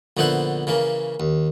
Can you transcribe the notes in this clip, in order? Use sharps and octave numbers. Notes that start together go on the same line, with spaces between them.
A#1 D3 B3 E4 C5 F#5
C#3 E3 A#3
D#2